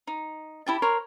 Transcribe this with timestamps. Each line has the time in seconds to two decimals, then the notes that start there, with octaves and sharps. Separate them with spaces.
0.07 D#4
0.66 E4 G4 A5
0.82 A#4 C#5 C6